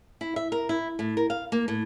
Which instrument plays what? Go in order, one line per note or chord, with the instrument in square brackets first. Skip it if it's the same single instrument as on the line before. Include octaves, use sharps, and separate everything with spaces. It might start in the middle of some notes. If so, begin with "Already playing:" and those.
[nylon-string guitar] E4
E5
A#4
E4
A2
A#4
F5
A#3
A2